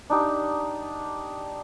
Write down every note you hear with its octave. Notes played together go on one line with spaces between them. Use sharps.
D4 D#4 G4